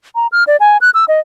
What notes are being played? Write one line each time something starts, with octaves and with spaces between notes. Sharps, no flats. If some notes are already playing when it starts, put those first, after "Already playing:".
A#5
F6
D5
G#5
F#6
E6
D#5